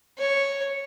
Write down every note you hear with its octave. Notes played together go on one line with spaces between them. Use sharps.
C#5